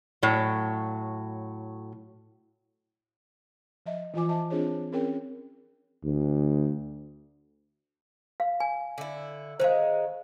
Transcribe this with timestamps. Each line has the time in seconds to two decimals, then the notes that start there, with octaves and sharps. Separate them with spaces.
0.23 A2 F#3
3.86 F3 D#5 E5
4.14 E3 F3 F4 C5 G#5 D6
4.29 C5 D#5 E5 A5
4.50 C4 D4 F4 G#4 C5 C#5
4.92 C4 C#4 G#4 A#4 C#5 G5
6.05 D2
8.40 F5
8.60 G#5
8.98 D3 E4
9.60 D#3 G#3 C5 F5